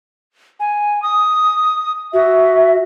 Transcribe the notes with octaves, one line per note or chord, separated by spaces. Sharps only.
G#5
D#6
F#4 E5